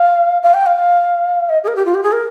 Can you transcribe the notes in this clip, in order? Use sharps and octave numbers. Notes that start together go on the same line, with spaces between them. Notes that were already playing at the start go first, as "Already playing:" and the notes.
Already playing: F5
F5
G5
F5
D#5
G#4
A#4
G4
F4
G4
G#4
A#4